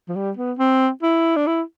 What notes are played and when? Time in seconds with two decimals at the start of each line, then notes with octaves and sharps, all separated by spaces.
0.09 F3
0.16 G3
0.37 B3
0.59 C4
1.03 E4
1.36 D4
1.47 E4